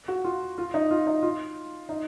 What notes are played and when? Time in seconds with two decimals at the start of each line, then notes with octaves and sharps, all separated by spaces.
0.08 F#4
0.24 F4
0.58 F4
0.74 D#4
0.91 F4
1.07 D#4
1.23 F4
1.89 D#4